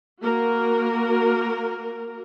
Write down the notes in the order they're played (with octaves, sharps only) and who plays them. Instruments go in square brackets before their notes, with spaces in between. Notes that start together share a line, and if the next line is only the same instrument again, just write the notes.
[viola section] A#3 F#4 A#4